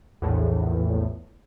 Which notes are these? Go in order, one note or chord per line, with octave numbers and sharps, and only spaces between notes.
A#1 E2 A2